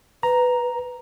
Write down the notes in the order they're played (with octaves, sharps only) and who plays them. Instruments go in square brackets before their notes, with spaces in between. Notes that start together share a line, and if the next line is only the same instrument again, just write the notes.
[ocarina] B4 [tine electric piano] A#5